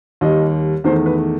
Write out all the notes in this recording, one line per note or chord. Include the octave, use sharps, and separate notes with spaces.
D#2 D#3 G3 D#5
E2 D#3 A3 C5
B4